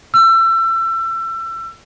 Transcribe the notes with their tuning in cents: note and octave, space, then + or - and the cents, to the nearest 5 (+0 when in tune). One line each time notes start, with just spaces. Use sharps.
E6 +30